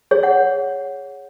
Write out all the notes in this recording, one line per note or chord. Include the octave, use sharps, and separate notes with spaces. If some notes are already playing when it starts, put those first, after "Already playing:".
G#4 C#5
C#5 F#5